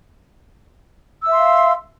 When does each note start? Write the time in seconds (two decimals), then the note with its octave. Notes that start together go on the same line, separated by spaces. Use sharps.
1.22 E6
1.26 E5
1.31 C6
1.36 F5